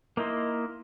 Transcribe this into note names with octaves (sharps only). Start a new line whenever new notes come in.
A#3 D#4 E4 D#5 C6